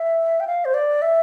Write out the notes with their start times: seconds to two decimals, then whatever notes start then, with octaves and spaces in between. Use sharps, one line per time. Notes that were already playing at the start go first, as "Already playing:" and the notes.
Already playing: E5
0.40 G5
0.47 F5
0.65 C5
0.74 D5
1.02 E5